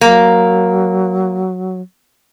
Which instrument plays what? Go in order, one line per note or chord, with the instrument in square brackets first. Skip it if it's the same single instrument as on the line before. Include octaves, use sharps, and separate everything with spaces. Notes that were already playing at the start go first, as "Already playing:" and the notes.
[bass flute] F#3 [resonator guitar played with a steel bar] A#3